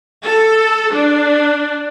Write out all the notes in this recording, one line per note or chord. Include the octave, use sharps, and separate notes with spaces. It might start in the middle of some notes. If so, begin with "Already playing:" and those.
A4
D4